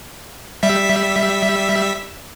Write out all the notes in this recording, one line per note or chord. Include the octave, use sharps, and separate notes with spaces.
G3 E5 B6